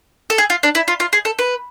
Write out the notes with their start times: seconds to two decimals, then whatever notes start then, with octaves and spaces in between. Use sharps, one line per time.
0.30 A4
0.38 G#4
0.50 F4
0.63 D4
0.75 E4
0.88 F4
1.00 F4
1.13 G#4
1.25 A4
1.39 B4